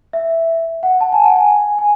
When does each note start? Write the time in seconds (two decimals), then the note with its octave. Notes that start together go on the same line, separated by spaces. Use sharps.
0.13 E5
0.83 F#5
1.01 A5
1.12 G#5
1.24 F#5
1.37 G#5
1.79 G#5